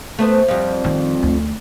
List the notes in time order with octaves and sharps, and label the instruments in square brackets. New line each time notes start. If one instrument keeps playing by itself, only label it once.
[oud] A3 B3 C5
F2 G3
[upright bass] D#3 C4
D2